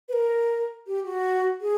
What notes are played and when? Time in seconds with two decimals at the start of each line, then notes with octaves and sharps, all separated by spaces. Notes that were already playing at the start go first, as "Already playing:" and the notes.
0.09 B4
0.13 A#4
0.87 G4
1.05 F#4
1.61 G#4